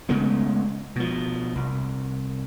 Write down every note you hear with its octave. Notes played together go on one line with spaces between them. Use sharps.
C#3 G#3 A3 B3
B2 F3
C2